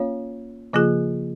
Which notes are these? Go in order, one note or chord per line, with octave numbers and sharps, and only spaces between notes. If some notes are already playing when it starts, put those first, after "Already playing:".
Already playing: A#3 C#4 F4 C#5 F5
C#3 F3 A#3 F4 G#4